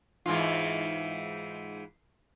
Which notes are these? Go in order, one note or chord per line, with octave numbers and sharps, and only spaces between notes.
G#2 E3 F4